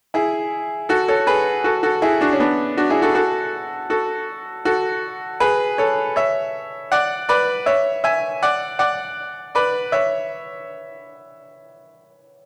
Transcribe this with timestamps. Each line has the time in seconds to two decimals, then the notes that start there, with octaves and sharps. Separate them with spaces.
0.14 E4 G#4
0.89 F#4 A4
1.08 A4 C#5
1.27 G#4 B4
1.64 F#4 A4
1.83 F#4 A4
2.02 E4 G#4
2.21 D4 F#4
2.33 C#4
2.40 B3 D4
2.77 D4 F#4
2.90 E4 G#4
3.02 F#4 A4
3.15 F#4 A4
3.90 F#4 A4
4.65 F#4 A4
5.40 G#4 B4
5.78 A4 C#5
6.16 C#5 E5
6.92 D5 F#5
7.29 B4 D5
7.66 C#5 E5
8.04 E5 G#5
8.43 D5 F#5
8.79 D5 F#5
9.55 B4 D5
9.92 C#5 E5